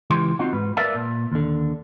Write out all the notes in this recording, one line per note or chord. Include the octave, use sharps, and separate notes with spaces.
C#2 E3 G4 C6
C4 D#4 F4 F#4
G#2 B4
A#4 B4 D5 E5 F5 A5
A#2
D#2 D3